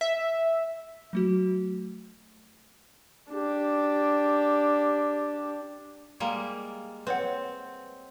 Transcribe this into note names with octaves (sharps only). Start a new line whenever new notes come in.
E5
F#3 A3 F#4
D4 G4
G3 G#3 A#3
C4 B4 C#5 F#5